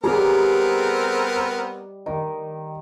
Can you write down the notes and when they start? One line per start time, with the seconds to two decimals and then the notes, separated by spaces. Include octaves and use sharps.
0.04 G3 B3 C4 G#4 A#4 C#5 D#5 A#5
2.06 D#3 D#5